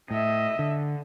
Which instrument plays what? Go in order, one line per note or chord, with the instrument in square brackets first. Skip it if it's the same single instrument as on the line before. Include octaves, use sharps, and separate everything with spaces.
[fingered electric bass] A2 [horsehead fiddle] D#5 E5
[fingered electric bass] D3